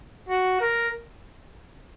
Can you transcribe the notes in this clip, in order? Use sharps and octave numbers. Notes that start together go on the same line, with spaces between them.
F#4
A#4